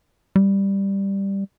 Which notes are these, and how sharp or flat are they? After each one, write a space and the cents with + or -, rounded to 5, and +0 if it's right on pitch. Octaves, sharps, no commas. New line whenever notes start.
G3 +5